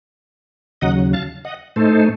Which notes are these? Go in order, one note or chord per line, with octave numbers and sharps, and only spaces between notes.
D#2 C#3 F#3 D#5 F#5
F5 A5
D#5 F#5
A2 A3 D#4 A4 C5